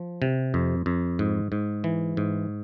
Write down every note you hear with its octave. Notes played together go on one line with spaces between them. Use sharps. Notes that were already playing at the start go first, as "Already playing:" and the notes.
Already playing: F3
C3
F2
F2
G#2
G#2
E3
G#2